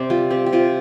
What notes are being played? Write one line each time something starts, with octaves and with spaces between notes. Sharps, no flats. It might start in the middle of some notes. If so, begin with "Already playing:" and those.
Already playing: C3 C4 C5 D5
G3 F4
C4 G4
G4
C3 F4